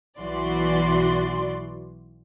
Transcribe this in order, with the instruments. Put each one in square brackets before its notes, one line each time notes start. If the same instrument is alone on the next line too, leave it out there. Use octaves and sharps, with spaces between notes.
[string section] B1 E3 F#4 D5 C6